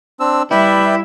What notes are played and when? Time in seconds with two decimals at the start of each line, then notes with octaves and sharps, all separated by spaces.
0.20 C4 D4 E6
0.51 G3 E4 B4 D5 E5 G5